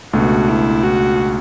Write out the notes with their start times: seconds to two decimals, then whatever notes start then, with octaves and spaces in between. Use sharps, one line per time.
0.13 C#2 B2 A3 D4 F#4
0.49 E4
0.84 F#4